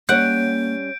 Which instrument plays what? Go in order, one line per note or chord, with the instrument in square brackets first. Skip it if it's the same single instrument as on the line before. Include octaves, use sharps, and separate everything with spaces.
[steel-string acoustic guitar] G3 C#4 C#5 [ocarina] A#3 [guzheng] F#5 [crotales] G6 D7